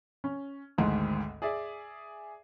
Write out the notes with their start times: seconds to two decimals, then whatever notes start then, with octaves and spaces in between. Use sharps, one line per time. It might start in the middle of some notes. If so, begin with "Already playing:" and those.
0.24 C#4
0.78 G#1 D2 G#2
1.42 G#4 D5 E5